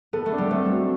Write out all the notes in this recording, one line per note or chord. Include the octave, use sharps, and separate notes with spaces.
B3 A4
A3
D4
G3
A3 C4
F#3